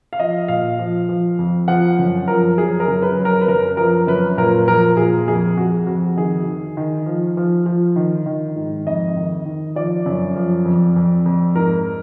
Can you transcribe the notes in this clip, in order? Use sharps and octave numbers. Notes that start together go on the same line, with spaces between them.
F5
F3 D#5
A#2 F5
F3
F3
F2
F3 F#5
F#2
F3 A#4
F#3 G#4
A#4
F#2
B4
F#3
A#4
B4
F#2 A#4
F3 A#4
F#2 B4
A#2 A#4
F3 A#4
A#2 G#4
F2 G#4
F2 F#4
F2 F#4
D#3 G#4
D#3
D#3
F3
F3
F3
D#3
D#3
G#2
F2 D#5
D#3
D#3
F3 D5
F#2
F3
F2
F2
F2
G#2 A#4